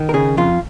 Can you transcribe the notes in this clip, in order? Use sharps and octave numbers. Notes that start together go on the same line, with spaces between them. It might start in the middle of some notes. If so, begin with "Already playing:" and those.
Already playing: D#3
A#4
C#3 G#4
F2 F4